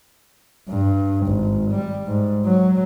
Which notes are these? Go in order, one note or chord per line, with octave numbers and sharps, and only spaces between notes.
G2
G#1
G3
G#2
F#3